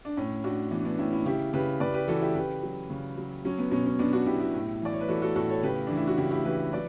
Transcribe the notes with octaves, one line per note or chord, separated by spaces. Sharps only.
D4
A2 C#4
A2 D4 F#4
E3 B3 D4
B3 D4
A2 C#4 E4
C#4 E4
C#3 E4 G4
C#3 G4 B4
C#3 B4 D5
G4 B4
E3 F#4 A4
E4 G4
C#3 G4 B4
F#3
C#3
F#3
F#3 C#4
B3
B2 C#4
C#4
B2 B3 D4
D4 F#4
B2 E4 G4
E4 G4
A2
E3 D5
C#5
B4
E3 F#4 A4
F#4 A4
A2 F#4 A4
A4 C#5
C#3 G4 B4
E3 D4
E4
F#4
C#3 E4 G4
E4 G4
E3 G4 B4
F#3 B4 D5